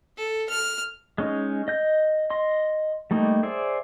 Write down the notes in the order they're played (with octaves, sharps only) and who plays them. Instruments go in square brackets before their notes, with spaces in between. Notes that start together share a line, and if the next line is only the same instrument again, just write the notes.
[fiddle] A4
F6
[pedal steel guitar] G#3 C#4 D#4
D#5 G6
D#5 C6
G3 A3 A#3 D#4
G#4 C5 D5 E5